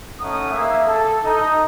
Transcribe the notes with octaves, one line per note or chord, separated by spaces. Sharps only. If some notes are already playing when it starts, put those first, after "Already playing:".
A3 C#4 D#4 F#5 D#6
A#3 G#4 E5
A4
D#4